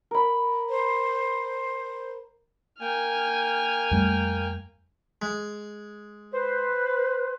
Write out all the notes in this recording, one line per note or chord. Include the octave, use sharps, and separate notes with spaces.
A#4 B5
C5
A#3 G5 G#5 F6
F2 G3 A3
G#3
B4 C5